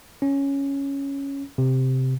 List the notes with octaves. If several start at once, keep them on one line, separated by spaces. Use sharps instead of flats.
C#4
C3